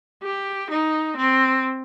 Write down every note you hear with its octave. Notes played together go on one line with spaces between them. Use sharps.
G4
D#4
C4